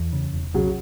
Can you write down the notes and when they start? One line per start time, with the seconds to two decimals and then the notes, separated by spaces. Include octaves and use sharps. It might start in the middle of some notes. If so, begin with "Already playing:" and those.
Already playing: E2
0.13 C#3
0.33 E1
0.54 B1 C#3 F#3